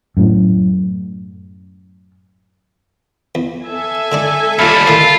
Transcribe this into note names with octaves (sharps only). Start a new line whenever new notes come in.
F#2 A2
E2
A4 E5 G#5
D3 G#3 D4
D#2 G3 A3 F4 A5 B5 F6
A2 D3 D#3 F4